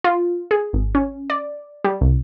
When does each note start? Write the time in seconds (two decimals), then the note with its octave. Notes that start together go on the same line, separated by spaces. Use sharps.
0.04 F4
0.51 G#4
0.73 G#1
0.95 C#4
1.30 D5
1.84 G3
2.01 C2